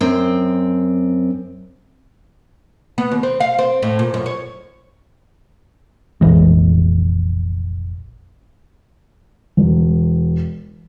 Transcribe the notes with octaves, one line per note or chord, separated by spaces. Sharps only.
F#2 C4
B3
D#2
C4
F5
C4
A2
A#2
F#2
C#5
F1 A#1 E3 G#3
E1